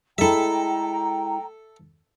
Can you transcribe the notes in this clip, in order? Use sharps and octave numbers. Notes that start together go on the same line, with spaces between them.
G#3 E4 A4 E5 G5 A#5